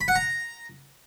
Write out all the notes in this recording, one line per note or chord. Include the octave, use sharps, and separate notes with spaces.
B5
F#5
A#5